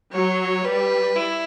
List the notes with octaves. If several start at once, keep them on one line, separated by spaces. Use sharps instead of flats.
F#3 C#5
G3 B4
E4